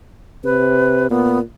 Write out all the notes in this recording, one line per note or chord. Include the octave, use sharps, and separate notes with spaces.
C3 B4
A#2 B3